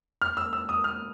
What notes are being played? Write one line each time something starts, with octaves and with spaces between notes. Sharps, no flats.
F6
E6
E6
D#6
F6